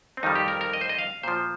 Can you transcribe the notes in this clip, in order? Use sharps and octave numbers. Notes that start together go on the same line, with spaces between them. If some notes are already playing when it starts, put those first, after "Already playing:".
C4
F2 D#3 G3 D#4
G4
A#4
A#4
D#5
C5
D#5
F5
A#2 F3 C5